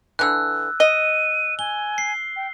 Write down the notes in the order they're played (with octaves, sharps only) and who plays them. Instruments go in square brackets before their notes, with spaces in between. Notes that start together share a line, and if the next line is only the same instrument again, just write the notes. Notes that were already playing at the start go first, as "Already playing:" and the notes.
[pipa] D3 E3 [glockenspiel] E6 F#6
[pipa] D#5 [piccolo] D#7
[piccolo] G#5 [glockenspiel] G7
[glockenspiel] C7
[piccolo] G5